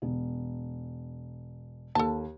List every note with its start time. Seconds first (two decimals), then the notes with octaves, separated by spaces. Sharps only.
0.02 E1
1.95 D#2 A4 A5